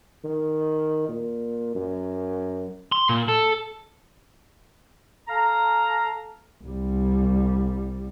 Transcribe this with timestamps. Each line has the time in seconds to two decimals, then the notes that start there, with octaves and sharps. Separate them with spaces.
0.24 D#3
1.09 A#2
1.75 F#2
2.92 C6
3.09 A#2
3.28 A4
5.28 A4 F5 A#5
6.65 C2 G3